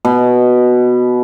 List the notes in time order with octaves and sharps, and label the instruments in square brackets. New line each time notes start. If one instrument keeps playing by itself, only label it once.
[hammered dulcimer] B2